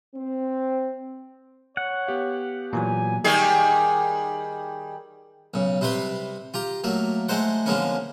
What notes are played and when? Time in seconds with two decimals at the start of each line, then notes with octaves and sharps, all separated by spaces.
0.15 C4
1.77 C#5 F#5
2.07 B3 G4 F5
2.73 A#2 E3 F#3 G#5
3.24 D#3 G3 G#4
5.54 B1 C#3
5.81 C3 G3 C4 B4 C6
6.54 F4 G4 A#5
6.84 F#3 A3 A#3
7.29 G#3 A3 D#4 C5 F#5
7.66 D3 F3 G#3 A#3 B3 C#4